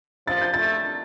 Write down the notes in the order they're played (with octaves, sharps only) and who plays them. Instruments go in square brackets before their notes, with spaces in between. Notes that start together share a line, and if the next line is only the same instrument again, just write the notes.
[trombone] F3 [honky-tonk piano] A6
[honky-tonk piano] G6
[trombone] A3 [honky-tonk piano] A6